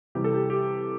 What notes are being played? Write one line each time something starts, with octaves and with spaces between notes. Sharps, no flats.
C3 E3 G3 G4
A4
G4
G4